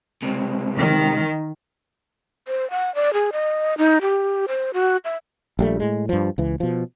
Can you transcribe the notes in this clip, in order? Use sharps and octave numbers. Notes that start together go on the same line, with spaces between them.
C#2 C3
D#3
C5
F#5
D5
G#4
D#5
D#4
G4
C5
F#4
E5
A#1 G3 A3
A2 G#3
G2 F3
C#2 E3
B2 F3